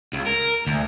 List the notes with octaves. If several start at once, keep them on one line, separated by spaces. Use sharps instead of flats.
C#2
A#4
D2